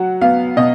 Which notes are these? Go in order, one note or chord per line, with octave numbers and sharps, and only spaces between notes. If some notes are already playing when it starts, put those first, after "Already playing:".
Already playing: F#3 F#5
B3 F5
B2 D#5